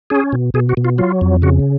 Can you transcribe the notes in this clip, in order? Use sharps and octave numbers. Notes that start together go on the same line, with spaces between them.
C#4 G#4
B2
B2 G#4
F#4
B2
F4
F#3 F4
F2
C#3 F#4